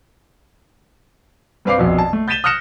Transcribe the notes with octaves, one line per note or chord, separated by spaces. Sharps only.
G2 C4 B4 F5 D6 C7
A#1 F2 B2
A5
A3
G6 A6 B6 D#7 E7 G7
D#6 F6 F#6 A#6 C#7 E7